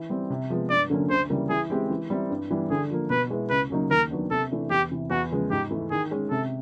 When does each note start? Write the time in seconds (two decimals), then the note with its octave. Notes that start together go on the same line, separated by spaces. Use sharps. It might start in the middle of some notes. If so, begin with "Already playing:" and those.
Already playing: E3
0.10 G3 C4
0.30 C3
0.50 F3 G#3 B3
0.70 G2 D5
0.90 D3 F#3 A#3 C#4
1.10 D2 C5
1.30 C#3 E3 G3 A#3
1.50 E3 G#4
1.70 G#3 C4 E4 G4
1.90 E3
2.10 G3 C4 E4
2.30 G2
2.50 E3 G3 B3
2.70 D3 G#4
2.91 F3 A#3
3.10 B2 B4
3.30 G#3 B3 E4
3.50 C#2 B4
3.70 C#3 F#3 A#3 D#4
3.91 D#2 A#4
4.10 D#3 F#3 B3 D4
4.31 C3 A4
4.51 E3 A3 D4
4.70 E2 G4
4.91 C3 E3
5.10 E2 F#4
5.31 C#3 F3 G#3 B3
5.51 G#2 G4
5.71 E3 A3
5.91 D#3 G#4
6.11 G#3 C#4
6.30 C3 A4